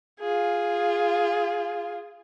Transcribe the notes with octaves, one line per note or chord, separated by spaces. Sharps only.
F4 G#4